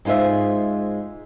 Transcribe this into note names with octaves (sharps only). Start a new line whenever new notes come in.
G#2 G#3 F4 C5 E5